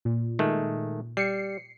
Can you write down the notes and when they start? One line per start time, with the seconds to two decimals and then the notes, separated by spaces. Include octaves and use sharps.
0.05 A#2
0.39 D#3 G#3 A3
1.17 G3 C7 C#7